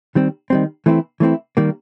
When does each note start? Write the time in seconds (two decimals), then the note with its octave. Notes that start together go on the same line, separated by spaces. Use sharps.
0.15 D#3 G3 C4
0.50 D#3 G3 C4
0.86 E3 A3 C4 E4
1.20 E3 A3 C4 E4
1.57 D#3 G3 A#3